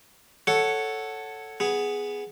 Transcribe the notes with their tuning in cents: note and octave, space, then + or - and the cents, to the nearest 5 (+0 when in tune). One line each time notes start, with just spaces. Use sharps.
A4 +0 C#5 -5 F#5 +0
B3 +0 G#4 +0